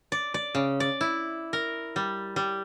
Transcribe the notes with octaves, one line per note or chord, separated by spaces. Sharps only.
D5
D5
C#3
D5
E4
A#4
G3
G3